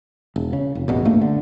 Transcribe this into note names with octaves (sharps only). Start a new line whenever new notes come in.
E1
C#3
F1
A1 E2 B2
C#2 G2 A3 A#3
D3